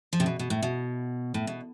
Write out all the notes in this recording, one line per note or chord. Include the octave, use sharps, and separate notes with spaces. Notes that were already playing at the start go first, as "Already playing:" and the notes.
F3
C3
B2
B2
A2
B2
A2
B2